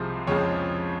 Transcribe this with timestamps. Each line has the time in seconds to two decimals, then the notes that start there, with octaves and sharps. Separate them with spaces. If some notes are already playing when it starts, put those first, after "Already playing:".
Already playing: C2 C3 F3 G#3 C5
0.27 F2 C#3 F3 G#3 C4 C#5